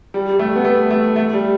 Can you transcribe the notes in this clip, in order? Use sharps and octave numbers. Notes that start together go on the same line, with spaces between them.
G3
G3
A3
B3
A3
A3
A3
G3